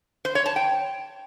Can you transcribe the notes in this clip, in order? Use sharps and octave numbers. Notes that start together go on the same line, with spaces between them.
C5
C#5
A5
G5